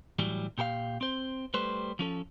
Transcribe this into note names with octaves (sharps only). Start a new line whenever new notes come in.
A2 E3 F#3 G3
A#2 G4 A4 F5
C4 C5
G3 A3 B4 C5
F3 C#4 A4